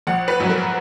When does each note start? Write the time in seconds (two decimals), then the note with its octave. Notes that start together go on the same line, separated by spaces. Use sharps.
0.07 A#1 F#5
0.28 B4
0.39 G#2 F#3 C#4
0.50 A#4